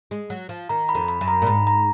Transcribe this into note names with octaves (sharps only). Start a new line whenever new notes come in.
G#3
F#3
F3
D#3 A#5
B5
F2
B5
F#2
A#5
A#2
G#2 B5
A#5